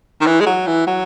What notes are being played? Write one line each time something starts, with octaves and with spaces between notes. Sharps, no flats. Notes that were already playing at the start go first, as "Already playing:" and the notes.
D#3
E3
G#3
F#3
E3
F#3